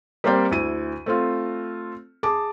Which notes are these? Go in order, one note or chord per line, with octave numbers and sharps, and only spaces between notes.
G3 A#3 C4 C5 D5 G5
D2 E4 D#7
A3 C4 F4
G#4 A5 D6